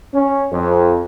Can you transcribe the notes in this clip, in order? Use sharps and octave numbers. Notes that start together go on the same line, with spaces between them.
C#4
F2